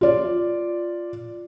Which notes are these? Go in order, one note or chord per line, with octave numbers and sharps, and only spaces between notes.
F4 D5